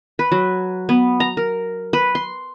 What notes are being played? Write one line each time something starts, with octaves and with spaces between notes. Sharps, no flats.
B4
F#3
B3
A#5
A#4
B4
C6